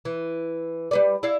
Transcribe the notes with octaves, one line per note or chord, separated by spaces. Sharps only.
E3
G3 B4 D5
E4 D5 F5